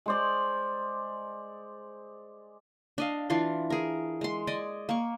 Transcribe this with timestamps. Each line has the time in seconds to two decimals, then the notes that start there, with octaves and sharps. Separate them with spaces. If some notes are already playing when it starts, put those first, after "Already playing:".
0.06 G#3 C5 D5
2.98 D4 D#5 F5
3.30 E3 D4 F4 C6
3.70 G#4 A#4
4.21 G#3 C6
4.47 D5 D#5 G#5
4.89 A#3 C#6